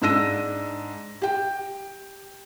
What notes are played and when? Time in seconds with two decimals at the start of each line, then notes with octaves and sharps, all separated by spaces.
0.02 G#2 D4 E6 A#6 D#7
1.22 G4 G5